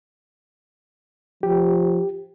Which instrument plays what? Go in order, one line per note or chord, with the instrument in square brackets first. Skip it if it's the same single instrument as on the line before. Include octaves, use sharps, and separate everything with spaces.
[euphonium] F3 [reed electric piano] G4